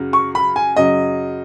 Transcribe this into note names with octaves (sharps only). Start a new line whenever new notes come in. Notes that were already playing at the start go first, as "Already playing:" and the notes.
Already playing: F#2 C#3 F#3
C#6
B5
G#5
F#2 C#3 F#3 D#5